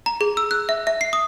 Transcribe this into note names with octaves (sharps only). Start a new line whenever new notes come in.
A#5
G#4
E6
F#6
E5
E5
C7
D#6